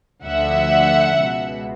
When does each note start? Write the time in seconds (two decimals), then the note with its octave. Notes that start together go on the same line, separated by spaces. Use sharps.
0.24 D2 D3 F3 E5 F#5
1.18 C#2 B2